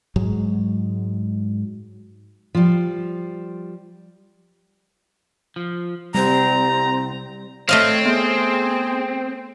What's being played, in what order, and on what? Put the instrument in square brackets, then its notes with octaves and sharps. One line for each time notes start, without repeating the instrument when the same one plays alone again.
[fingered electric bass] G#2 F#3 G#3
[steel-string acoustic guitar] F3 G3
[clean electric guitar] F3
[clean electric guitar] C2 [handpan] G3 [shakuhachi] C4 [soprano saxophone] A#5
[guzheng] A3 D#5 F5 [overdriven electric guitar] C4 [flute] C#5
[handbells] B3 [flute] G#4